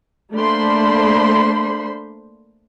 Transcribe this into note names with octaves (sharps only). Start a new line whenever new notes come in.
A3 A#3 D4 C5 B5 C6